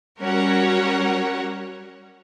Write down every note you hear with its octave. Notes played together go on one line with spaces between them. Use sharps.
G3 C#4 F#4 A#4 C#5 F#5